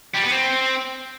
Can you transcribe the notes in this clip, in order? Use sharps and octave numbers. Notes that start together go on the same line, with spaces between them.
G3
B3
C4